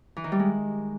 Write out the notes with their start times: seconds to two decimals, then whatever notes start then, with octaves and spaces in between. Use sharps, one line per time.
0.17 E3
0.24 D#3
0.32 G3
0.39 G#3